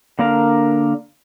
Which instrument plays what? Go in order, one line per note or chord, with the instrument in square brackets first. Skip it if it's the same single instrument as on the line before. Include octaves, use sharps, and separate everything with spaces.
[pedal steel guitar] D3 A#3 D4 A#4 F5